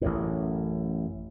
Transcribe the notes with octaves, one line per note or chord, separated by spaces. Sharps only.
A1 F#2 A2